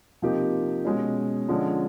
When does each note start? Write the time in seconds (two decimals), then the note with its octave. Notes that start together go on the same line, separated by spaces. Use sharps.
0.22 C3 F3 A#3 D#4 G4
0.85 B2 G#3 C#4
1.48 D3 F3 G#3 C#4